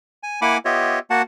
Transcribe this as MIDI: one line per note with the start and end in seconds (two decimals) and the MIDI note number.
0.23 0.40 80
0.42 0.58 58
0.42 0.58 64
0.42 0.58 78
0.42 0.58 80
0.42 0.58 83
0.42 0.58 86
0.65 0.99 59
0.65 0.99 65
0.65 0.99 67
0.65 0.99 73
0.65 0.99 75
0.65 0.99 76
1.10 1.22 58
1.10 1.22 66
1.10 1.22 78
1.10 1.22 81